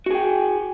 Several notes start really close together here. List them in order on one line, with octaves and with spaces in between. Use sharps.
F#4 G#4 G5